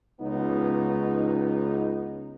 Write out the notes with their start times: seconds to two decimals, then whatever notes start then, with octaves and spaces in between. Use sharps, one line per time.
0.21 C#2 B3 D#4